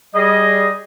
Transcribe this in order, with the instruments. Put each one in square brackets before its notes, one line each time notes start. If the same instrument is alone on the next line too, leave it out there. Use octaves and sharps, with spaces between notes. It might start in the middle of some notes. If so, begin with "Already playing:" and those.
[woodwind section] G3 G#4 D#5